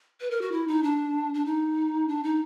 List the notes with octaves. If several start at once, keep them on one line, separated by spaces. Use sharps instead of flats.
B4
A#4
F#4
E4
D#4
D4
D4
D#4
D4
D#4